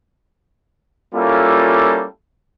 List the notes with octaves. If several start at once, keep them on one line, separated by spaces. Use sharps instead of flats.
G3 A#3 C#4 E4 F4 A4